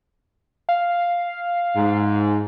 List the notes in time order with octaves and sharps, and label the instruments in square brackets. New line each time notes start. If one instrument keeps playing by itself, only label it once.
[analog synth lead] F5
[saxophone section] G#2